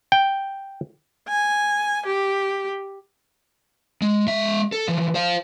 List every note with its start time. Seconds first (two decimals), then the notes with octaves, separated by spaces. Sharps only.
0.12 G5
1.29 G#5
2.06 G4
4.02 G#3
4.27 G#3 E5
4.72 A4
4.88 E3 F3
5.15 C5 F5